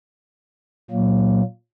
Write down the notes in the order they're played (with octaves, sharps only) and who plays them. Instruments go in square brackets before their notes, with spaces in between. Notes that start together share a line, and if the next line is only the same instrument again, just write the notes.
[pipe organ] A#2 F#3 A#3